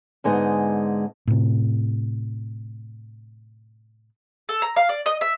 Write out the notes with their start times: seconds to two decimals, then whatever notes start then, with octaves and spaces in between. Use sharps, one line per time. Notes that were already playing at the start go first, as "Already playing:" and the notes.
0.24 G#2 D3 G#3 B3 D#4
1.27 A2 C3
4.49 A4
4.62 A#5
4.76 F5
4.89 D5
5.06 D#5
5.21 E5